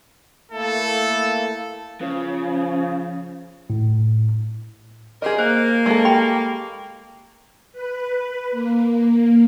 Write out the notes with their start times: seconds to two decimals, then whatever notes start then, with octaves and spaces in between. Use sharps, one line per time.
0.52 A3 A#3 E4 A4
2.01 C#3 F3
3.70 A2
5.22 C4 G4 G#4 A#4 D#5
5.38 A#3 C5
5.86 G#3 A4
6.05 G4 G5 B5
7.72 B4
8.51 A#3